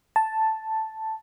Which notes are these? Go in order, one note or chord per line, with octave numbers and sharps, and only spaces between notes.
A5